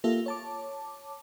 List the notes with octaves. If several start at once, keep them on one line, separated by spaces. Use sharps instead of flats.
A#3 F4 G4 A4 E5 F5
C#5 A5 D6